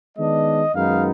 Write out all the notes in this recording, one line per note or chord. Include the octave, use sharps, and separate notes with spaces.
D#3 G#3 B3 D4 D#5
F#2 D#3 G#3 B3 D#4 F5